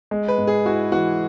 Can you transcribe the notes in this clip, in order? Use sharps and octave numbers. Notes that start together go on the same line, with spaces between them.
G#3
B4
G#2
G#4
E4 F#4
E3 F#4